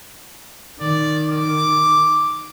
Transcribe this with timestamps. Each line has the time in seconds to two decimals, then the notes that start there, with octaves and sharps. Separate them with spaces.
0.80 D#3 D5
1.27 D6